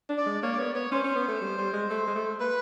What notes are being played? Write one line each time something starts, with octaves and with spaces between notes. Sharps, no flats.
D4
D5
G#3
A#3 C#5
D5
B3 C#5
B3 C#5
C#4 C5
C#4
B3
A3
G3
G3
G#3
A3
G#3
A3
A#3 B4